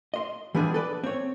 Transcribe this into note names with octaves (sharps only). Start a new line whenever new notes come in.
D#5 C6
E3 F3 G3 B3 D4 G#4
A4 B4 D5
C4 C#5